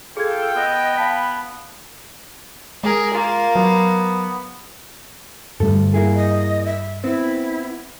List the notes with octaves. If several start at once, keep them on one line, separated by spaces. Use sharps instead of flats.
F4 G#4 A4 G5 G#6
B3 D#5 E6
F5 A5 B5 B6
G#3 G#4 A#4
A#3 F4
F#3 B3
D2 G2 G3 A4
A#3 E4 G#4
D#5
E5
B3 C4 E4